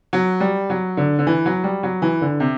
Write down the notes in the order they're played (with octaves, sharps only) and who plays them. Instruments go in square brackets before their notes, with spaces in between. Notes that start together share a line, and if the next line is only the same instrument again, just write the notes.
[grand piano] F#3
G3
F#3
D3
D3
E3
F#3
G3
F#3
E3
D3
C3